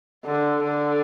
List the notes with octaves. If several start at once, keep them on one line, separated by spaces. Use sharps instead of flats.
D3
D3